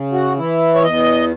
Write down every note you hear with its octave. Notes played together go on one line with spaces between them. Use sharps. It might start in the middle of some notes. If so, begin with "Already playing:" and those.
Already playing: C#3
F#4
E3 E4
C#5
E2 D#5